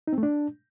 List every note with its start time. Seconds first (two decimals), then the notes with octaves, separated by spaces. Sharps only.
0.07 D#4
0.13 C4
0.18 A3
0.23 D4